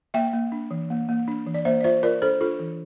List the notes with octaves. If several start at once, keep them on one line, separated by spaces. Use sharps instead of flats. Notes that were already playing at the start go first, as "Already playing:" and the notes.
A#3 E5 G5
A#3
D4
E3
A#3
A#3
D4
E3
D5
A#3 C5 E5
D5
F4 C5 E5
F4 A#4 D5
D4 A4 C5
D4 F4 A4
E3